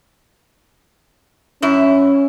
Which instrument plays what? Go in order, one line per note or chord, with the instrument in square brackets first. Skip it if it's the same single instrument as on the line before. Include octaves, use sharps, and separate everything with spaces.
[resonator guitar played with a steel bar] F#2 E4 [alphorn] C#4